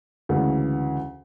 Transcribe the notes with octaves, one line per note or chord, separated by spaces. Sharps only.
D2 C#3 E3 G#3